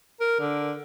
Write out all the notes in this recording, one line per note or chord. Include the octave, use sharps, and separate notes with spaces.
A#4
D3